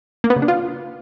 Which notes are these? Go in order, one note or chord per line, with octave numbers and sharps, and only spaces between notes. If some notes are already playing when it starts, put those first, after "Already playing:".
A#3
B3
C#3
D4
F4